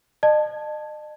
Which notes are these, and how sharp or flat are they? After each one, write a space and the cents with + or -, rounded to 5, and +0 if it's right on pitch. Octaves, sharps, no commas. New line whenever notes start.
D#5 -40 A5 +0